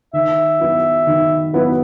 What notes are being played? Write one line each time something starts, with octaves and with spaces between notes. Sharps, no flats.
D#3 E5
F#3 B3 E4 B4
D#3
F#3 B3 E4 B4